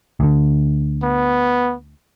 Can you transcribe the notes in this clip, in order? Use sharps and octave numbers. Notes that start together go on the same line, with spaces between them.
D2 D3
B3